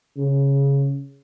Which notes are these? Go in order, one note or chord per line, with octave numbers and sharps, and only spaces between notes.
C#3